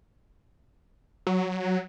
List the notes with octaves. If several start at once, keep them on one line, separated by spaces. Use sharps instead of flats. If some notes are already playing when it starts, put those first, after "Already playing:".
F#3